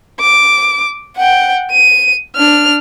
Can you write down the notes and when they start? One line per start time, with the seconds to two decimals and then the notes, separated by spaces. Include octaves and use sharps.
0.20 D6
1.17 F#5 G5
1.71 D#7
2.36 D4 F6